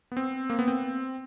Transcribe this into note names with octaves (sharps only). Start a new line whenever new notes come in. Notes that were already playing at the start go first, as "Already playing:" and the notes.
B3
C4
A#3
B3
C4